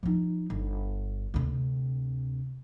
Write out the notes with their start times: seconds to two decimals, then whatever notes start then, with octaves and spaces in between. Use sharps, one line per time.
0.03 F3 D#4
0.50 G1
1.34 D2 C3